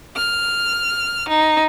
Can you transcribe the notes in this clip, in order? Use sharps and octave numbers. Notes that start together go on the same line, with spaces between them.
F6
D#4